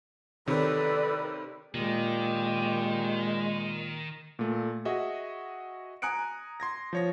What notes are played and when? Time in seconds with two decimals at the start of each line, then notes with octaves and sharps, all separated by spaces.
0.47 C3 D#3 A4 B4 C#5 D5
1.75 A#2 D#3 G#3 G4
4.39 A#2 A3
4.85 F#4 G#4 D#5 E5
6.02 G#5 A#5 D#6 F#6 C#7 D7
6.60 C6 G#6 A#6
6.93 F3 C#5 A#6